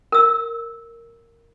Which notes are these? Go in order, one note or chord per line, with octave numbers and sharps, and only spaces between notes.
A#4 E6